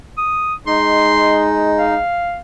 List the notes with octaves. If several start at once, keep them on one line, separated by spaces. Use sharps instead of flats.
D#6
G#3 D#4 C6
F5